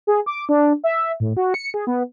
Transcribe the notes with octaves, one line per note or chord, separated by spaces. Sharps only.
G#4
D6
D4
E5
A2
F#4
C#7
G#4
B3